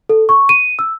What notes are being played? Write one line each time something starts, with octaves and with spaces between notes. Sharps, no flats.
A4
C#6
D#7
E6